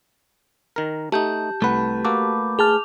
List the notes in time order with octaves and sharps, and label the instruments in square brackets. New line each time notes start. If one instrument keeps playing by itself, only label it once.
[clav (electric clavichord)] D#3 A#4
[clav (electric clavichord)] A3 D#4 [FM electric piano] G4 [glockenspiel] A5 G6
[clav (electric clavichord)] C2 F#5 [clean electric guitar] A3 B4
[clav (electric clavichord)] A#3 F#4 A4 [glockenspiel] D6
[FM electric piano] G#4 A5 F6 [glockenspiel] F7